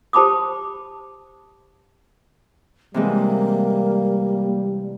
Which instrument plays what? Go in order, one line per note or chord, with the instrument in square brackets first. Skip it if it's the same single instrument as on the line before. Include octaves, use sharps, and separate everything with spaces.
[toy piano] G4 C5 A5 B5 D6 D#6
[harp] C3 E3 G#3 [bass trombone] G3 [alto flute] A#3